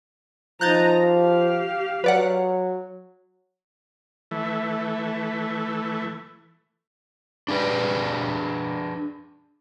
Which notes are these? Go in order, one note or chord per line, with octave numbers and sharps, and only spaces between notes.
F3 D#4 A#5 F#6 G6 A6
G4 F5
F#3 B4 D5 F#5
E3 A3
D4 G#4 B4 D5